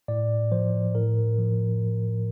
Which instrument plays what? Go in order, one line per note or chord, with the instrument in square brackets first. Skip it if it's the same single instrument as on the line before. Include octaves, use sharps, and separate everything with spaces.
[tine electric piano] A2 D5
F3 C5
A2 A#4
F3